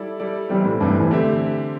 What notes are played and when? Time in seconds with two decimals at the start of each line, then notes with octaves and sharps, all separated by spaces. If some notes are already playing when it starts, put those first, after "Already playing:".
Already playing: G3 E4 A4 D5
0.20 G3 E4 A4 D5
0.49 C3 E3 G3 C4
0.65 A2
0.80 G2 C3 E3 C4
0.90 A2
1.00 E3
1.10 D3 A3 C4 G4 E5